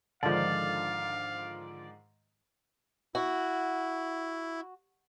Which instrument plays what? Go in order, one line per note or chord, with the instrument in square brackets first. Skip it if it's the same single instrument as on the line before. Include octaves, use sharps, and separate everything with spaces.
[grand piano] G#2 D#3 G#3 [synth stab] D3 F3 [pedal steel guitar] D5 [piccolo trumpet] F5
[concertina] E4 [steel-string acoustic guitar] F#4